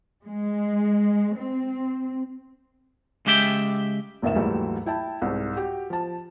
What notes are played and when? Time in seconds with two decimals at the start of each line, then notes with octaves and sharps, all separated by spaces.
0.23 G#3
1.35 C4
3.26 C#3 G#3 G4 E5 G5
4.22 F1 A#1 D#3 E5 E7
4.36 D#2 G#2 E3 F#3 G3 A3
4.86 E4 G5 A5
5.22 C2 G#2
5.56 F#4 G4
5.90 F3 A5